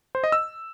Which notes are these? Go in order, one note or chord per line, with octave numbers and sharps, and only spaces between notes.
C5
D#5
E6